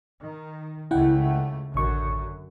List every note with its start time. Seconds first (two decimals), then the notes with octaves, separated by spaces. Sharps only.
0.22 D#3
0.91 C#2 C#3 A3 E4 F#5 G5
1.74 A1 F#2 D3 C#6